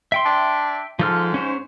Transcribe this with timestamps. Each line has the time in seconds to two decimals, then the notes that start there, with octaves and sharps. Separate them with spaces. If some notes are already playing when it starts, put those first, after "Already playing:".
0.12 E5 G5 C6
0.25 D4
0.99 G#2 F3 A4 F6
1.34 C#4 C5